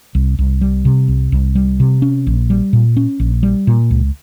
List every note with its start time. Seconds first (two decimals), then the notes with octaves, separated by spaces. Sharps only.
0.15 C2
0.39 C2
0.61 G3
0.85 C3
1.08 C2
1.32 C2
1.55 G3
1.80 C3
2.02 C#4
2.27 A#1
2.50 G3
2.73 A#2
2.97 C#4
3.20 A#1
3.43 G3
3.67 A#2
3.91 C#2